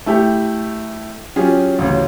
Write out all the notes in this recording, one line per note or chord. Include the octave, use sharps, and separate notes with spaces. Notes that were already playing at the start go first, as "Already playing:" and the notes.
A3 E4 G4 A4
F#3 C#4 F4 G4 G#4
A1 D2 C#3